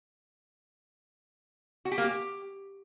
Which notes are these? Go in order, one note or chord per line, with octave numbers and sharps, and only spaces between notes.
F#4
G4
A#3
G4